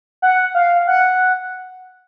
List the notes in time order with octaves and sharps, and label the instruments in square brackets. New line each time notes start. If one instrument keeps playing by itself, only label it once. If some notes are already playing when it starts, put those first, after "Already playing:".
[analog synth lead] F#5
F5
F#5